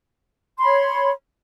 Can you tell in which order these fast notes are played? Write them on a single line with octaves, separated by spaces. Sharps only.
C6 B5 C#5